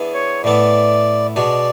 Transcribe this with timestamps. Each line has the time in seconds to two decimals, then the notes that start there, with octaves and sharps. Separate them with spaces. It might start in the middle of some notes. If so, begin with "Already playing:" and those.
Already playing: E3 B3 D4 G#4
0.14 C#5
0.44 A2 E3 B3 D5
1.36 B2 G#3 D4 D5